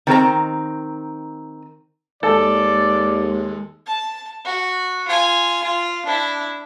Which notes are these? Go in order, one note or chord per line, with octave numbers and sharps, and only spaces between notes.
D#3 C4 A#4 A#5
D#2 G#3 A4 D5
A5
F#4
F4 G#5
F4
D4 E4